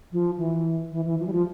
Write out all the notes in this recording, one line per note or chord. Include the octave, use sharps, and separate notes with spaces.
F3
E3
E3
E3
F3
G3
F3